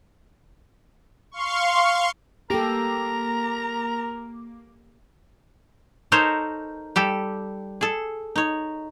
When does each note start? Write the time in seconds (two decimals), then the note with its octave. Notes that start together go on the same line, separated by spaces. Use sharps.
1.31 F5 C6 C#6
2.50 A#3 G4 A4 A#4 A#5 D6
6.12 D#4 A4 A#4 C5 C#5
6.96 G3 G4 A4
7.81 G#4 A4
8.36 D#4 C#5